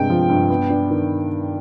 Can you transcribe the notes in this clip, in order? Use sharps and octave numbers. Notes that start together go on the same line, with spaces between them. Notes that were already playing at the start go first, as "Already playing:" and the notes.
Already playing: G2 C3 G#3 G5
F3
G2
B3
D4
D#3